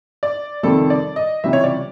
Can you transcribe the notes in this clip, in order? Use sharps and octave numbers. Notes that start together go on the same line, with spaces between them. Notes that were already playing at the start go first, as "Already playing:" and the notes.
D5
F2 C3 D#3 G3 A4
D5
D#5
C#2 C3 E3 G3 E5
C#5
D5